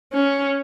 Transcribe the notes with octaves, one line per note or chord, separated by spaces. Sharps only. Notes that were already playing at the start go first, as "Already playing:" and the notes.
C#4